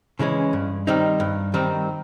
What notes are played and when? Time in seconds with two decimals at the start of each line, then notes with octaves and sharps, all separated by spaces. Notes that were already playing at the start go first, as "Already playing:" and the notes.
0.19 C#3 E3 G#3 C#4
0.53 G2
0.87 D#3 G3 C4 D#4
1.20 G2
1.54 D#3 G3 C4 D#4